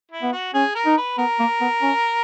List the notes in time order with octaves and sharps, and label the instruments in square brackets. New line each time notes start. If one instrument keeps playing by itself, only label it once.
[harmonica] E4
[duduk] B3
[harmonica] F#4
[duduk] C#4 [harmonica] G#4
[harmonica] A#4
[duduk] D#4
[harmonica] B4
[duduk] B3 [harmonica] A#4
[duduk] A#3
B3
C#4